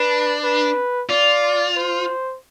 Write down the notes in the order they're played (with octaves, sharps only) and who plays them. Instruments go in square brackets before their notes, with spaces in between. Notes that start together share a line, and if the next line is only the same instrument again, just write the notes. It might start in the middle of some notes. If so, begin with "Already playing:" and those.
Already playing: [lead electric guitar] D4 [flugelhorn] B4
[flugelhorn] B4
[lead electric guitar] F4 [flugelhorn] D5
[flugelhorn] C5